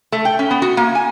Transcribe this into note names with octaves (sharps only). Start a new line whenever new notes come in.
A3
G5
C#4
B3
F#4
A#3
G#5